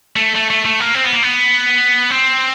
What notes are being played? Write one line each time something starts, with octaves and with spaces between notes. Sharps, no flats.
A3
A3
A3
A3
A#3
C4
B3
A#3
B3
C4